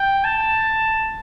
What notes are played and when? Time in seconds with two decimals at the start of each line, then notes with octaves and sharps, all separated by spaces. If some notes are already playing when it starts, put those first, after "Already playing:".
Already playing: G5
0.24 A5